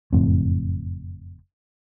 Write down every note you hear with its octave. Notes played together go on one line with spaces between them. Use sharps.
F#1 F2 A2 C4